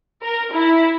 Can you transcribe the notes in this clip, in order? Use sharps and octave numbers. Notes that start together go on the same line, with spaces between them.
A#4
E4